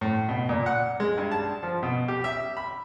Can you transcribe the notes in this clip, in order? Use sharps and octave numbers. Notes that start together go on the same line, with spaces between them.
A2
B2
A#2
F#5
G#3
G2
A5
F3
B2
G4
E5
B5